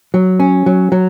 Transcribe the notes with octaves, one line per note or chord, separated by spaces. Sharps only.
F#3
C#4
F#3
F#3